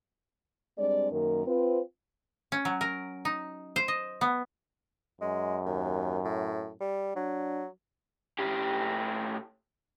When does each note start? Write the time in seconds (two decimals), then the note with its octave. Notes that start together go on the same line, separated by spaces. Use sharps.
0.78 G3 G#3 C4 D4 D5
1.11 F#2 D#3 A#3 A#4
1.46 C4 F4 B4
2.52 C#4
2.65 F#3
2.81 A#4
3.25 D#4
3.76 C5
3.88 D#5
4.21 B3
5.21 F#2 G#3
5.65 D#2
6.25 A2
6.81 G3
7.16 F#3 D4
8.39 A2 G4